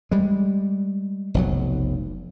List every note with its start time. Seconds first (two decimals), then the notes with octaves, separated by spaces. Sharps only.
0.11 G3 G#3
1.34 F1 B1 F#3